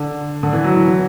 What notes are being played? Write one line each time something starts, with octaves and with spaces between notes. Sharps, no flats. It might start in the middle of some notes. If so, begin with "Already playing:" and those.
Already playing: D3
D3
E3
F#3
E3
E3